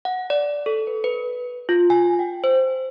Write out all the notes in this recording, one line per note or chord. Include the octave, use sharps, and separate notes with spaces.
F#5
D5
A4
B4
B4
F4
G#5
G5
C5